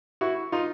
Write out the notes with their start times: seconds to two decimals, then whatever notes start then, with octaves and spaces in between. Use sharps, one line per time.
0.21 E4 F#4
0.52 D#4 F4